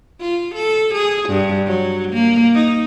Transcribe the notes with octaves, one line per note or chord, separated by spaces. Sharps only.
F4
A4
G#4
G2
F#3
A#3
D#4